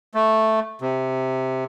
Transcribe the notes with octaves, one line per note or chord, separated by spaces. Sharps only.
A3
C3